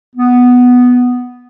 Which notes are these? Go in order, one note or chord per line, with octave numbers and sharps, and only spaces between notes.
B3